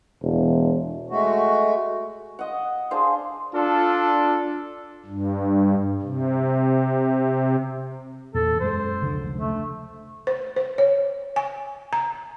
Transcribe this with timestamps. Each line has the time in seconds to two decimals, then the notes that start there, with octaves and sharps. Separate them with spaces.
0.23 E1
1.10 G#3 A3 F#4
2.39 D#5 F#5
2.91 D4 G#4 C5 F5
3.53 D4 F4 A4
5.06 G2
6.02 C3
8.34 E2 A#2 A4
8.60 F#2 G#3 C5
9.02 F1 C#2 D3
9.37 A3
10.27 C5
10.56 C5
10.78 C#5
11.36 G#5
11.93 A#5